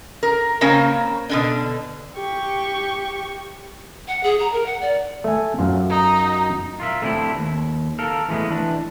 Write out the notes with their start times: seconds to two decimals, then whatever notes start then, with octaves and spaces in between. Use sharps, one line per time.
0.23 A#4
0.61 C#3 A#3 C4 C#4 A#4
1.29 B2 D3 D4
2.16 G4 C#6
4.08 F#5
4.23 G#4
4.40 A#5
4.53 A#4
4.66 F#5
4.81 D5
5.24 A3 G#5
5.58 F#2 F4
5.90 D#4
6.80 F4 A#4 E5
7.02 A3 C4 D4 E4
7.35 D#2
7.99 A4 A#4 F5
8.28 E3 G#3 A3 B3
8.48 E3 D4